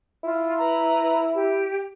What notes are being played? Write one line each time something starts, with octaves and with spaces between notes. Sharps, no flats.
E4 F4
B4 A#5
G4